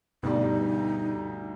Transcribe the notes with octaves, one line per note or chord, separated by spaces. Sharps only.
D2 G2 B2 G3 D#4